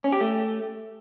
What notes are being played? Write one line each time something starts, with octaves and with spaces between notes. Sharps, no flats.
C#4
G4
A3